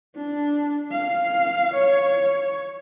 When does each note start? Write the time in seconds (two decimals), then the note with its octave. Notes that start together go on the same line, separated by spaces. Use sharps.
0.16 D4
0.92 F5
1.74 C#5